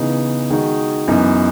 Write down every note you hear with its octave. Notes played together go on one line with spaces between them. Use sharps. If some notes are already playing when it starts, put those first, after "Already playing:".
Already playing: C#3 E3 B3 D#4
D#3 G#3 D#4 F#4
F#2 E3 B3 D#4